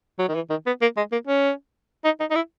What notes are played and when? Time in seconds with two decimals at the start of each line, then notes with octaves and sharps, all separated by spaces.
0.19 F#3
0.29 D#3
0.35 E3
0.50 D#3
0.67 B3
0.82 A#3
0.97 G#3
1.12 A#3
1.27 C#4
2.05 D#4
2.20 D#4
2.30 D#4
2.35 E4